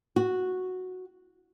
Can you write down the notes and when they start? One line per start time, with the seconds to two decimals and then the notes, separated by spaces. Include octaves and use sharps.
0.16 F#4